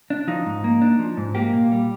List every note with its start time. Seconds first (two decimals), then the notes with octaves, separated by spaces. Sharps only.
0.10 D4
0.27 F3 D#4
0.46 G#2
0.64 A#3
0.81 D4
0.99 F3
1.17 G#2
1.35 A#3 G4
1.53 A#2
1.71 G3